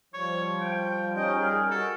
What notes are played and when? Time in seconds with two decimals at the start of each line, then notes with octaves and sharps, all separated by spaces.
0.14 F3 G3 C#5
0.61 G5
1.16 C#4 D#4 D#5 G5
1.37 G3 G#4 A#4
1.71 F#4 A4